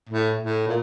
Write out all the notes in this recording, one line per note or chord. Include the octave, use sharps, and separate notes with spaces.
A2
A2
A#2